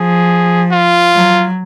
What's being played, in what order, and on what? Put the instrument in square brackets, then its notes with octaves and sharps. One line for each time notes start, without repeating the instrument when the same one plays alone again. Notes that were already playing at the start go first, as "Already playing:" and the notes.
Already playing: [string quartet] F3 [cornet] G#4
[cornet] F4
[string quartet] F#3